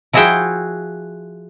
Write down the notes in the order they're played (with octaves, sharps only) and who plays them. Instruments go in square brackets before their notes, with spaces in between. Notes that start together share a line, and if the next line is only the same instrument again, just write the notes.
[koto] F3 E4 F#4 G#4 E5 G5